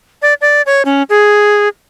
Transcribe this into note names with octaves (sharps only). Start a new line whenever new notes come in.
D5
D5
C#5
C#4
G#4